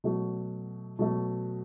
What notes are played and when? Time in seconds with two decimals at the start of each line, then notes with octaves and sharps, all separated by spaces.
0.04 B2 F#3 A3
0.99 B2 F#3 A3